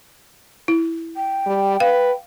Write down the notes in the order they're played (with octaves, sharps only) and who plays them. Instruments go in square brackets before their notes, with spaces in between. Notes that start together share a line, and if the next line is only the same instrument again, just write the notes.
[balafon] E4
[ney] G5
[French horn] G3
[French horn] B4 [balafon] F5